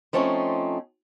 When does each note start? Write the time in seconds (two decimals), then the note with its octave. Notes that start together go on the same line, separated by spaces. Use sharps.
0.13 F3 A3 C4 C#4 D#4